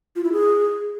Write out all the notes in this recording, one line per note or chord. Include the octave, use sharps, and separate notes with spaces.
F4
E4
G#4